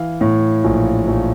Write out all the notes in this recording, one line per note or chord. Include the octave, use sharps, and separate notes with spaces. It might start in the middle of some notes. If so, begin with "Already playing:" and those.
Already playing: E3 F5
A2
A#1
A#1